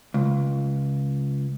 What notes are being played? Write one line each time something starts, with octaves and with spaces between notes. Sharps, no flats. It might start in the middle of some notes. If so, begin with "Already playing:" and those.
C#2